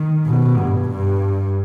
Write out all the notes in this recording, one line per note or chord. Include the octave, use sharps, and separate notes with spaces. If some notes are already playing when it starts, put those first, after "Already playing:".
Already playing: D#3
B2
G2
G2